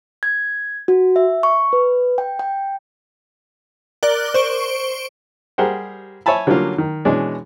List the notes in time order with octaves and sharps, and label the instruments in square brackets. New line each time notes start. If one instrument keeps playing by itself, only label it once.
[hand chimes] G#6
F#4
E5
C#6
B4
G5
G5
[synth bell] A#4 D5 D6 F#6 G7
C5 C#6 D7 G7
[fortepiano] G3 G4 G#4 A#4 C5 F#5
C#5 E5 G#5 A5 B5
D3 F#3 G3 A#3 C#4 F4
D#3
B2 E3 G#3 C#4 D4